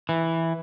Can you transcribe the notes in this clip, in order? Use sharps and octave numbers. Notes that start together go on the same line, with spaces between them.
E3